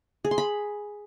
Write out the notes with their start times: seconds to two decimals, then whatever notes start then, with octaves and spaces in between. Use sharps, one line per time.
0.25 G#4
0.31 C6
0.38 B5